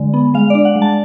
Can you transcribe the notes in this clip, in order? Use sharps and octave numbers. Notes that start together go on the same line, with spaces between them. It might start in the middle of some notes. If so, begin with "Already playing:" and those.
Already playing: D3 G#3
B3
G#3 F5
D4 D5
F#5
G#3
A5